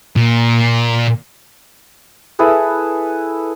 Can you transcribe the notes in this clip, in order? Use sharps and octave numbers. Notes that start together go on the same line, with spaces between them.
A#2
E4 G#4 A4 B4